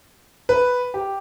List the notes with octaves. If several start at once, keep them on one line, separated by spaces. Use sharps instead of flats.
B4
G4